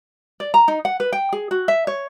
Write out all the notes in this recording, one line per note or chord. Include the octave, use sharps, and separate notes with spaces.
D5
A#5
D#4
F#5
B4
G5
G#4
F#4
E5
C#5